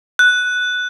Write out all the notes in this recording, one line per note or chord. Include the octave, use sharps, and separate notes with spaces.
F#6